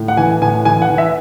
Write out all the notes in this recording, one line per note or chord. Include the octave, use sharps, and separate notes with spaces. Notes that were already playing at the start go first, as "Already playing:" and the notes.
Already playing: A2
F#5
E3 G#5
A2 G#5
E3 G#5
F#5
E3
E5